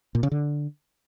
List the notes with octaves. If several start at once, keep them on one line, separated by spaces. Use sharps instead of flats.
A#2
C#3
D3